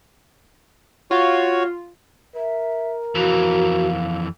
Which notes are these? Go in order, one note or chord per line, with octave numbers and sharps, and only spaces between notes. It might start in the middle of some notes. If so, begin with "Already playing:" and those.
F4 F#4 C#5
A#4 E5
F2 E3 F#4 F5